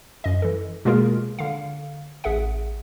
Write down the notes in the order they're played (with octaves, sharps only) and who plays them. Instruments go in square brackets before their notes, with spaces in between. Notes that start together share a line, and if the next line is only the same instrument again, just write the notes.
[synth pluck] F#2 D#5
E3 A4
B2 G#3 A#3 F4 G#4 A#4
D3 F5
A1 G#4 E5 F#5